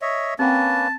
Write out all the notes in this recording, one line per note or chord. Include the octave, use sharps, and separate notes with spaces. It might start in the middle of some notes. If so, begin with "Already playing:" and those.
C#5 D#5 E5
A#3 C4 C#4 B4 F#5 G5 A5